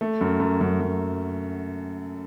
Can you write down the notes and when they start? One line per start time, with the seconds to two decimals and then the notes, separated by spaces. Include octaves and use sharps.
0.01 A3
0.21 F#2
0.40 F#2
0.61 F#2
0.80 F#2